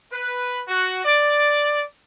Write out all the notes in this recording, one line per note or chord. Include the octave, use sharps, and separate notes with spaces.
B4
F#4
D5